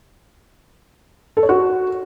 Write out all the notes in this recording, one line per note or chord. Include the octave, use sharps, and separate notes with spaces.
A4
C#5
F#4